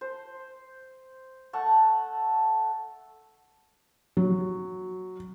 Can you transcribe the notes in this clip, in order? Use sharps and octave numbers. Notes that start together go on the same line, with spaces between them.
C5
A3 A4 F#5 C#6
F#3